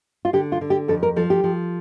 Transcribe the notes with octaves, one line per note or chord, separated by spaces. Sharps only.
F4
D3 G4
F4
D3
G4
F2 A4
A#4
F3 A4
G4
F3